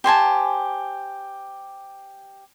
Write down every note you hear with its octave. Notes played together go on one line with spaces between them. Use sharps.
G4 C5 G#5 A5